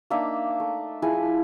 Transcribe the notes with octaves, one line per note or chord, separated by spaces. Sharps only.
A#3 D4 D#4 E5
A3
F3 E4 G#4 G#5